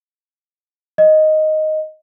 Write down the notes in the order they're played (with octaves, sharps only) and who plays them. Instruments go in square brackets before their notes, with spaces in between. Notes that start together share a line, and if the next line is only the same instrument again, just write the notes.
[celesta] D#5